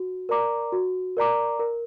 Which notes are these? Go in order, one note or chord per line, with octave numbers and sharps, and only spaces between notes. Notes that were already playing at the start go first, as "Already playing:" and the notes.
Already playing: F#4
A#4 D5 A#5 D6
F#4
A#4 D5 A#5 D6
A#4